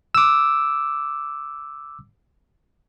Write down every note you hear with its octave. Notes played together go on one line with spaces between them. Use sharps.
D6 E6